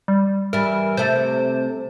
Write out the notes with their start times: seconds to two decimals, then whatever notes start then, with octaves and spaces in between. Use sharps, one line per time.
0.08 G3
0.53 E3 G3 A#4
0.97 C3 A3 C5